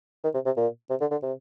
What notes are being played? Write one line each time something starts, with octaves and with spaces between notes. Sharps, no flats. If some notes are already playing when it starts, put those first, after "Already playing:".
D#3
C3
C3
A#2
C3
D3
D3
C3